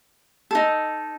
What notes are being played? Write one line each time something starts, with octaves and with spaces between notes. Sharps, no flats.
D#4 A4